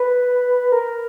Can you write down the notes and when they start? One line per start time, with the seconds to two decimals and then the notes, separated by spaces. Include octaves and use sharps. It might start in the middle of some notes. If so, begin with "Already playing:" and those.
Already playing: B4
0.72 A#4